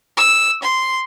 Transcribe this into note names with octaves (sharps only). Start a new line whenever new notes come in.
E6
C6